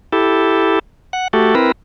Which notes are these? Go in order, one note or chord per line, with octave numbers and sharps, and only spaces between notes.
E4 G4 A4
F#5
A3 F#4 G4 A4
C4 E4 A#4 B4